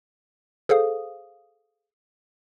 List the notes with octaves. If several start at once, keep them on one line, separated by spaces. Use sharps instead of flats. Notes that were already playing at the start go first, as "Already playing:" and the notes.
G#4 A4 C5 F5 D#6